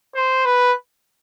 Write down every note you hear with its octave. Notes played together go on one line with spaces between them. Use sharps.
C5
B4